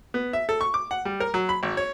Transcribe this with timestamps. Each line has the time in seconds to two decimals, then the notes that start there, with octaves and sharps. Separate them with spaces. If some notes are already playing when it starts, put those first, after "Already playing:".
0.14 B3
0.33 E5
0.49 A4
0.61 C#6
0.74 D6
0.91 F#5
1.05 G3
1.20 A#4
1.34 F#3
1.49 B5
1.63 G#1
1.77 C#5